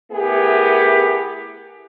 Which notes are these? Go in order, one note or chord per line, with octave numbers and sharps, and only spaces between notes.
A3 B3 E4 G4 G#4 A#4